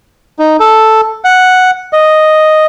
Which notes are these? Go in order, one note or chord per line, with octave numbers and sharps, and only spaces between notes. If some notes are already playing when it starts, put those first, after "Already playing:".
D#4
A4
F#5
D#5